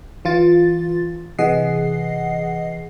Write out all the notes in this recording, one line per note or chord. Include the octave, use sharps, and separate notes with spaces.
E3 F4 A6
C3 E3 G#4 D#5 F#5 C7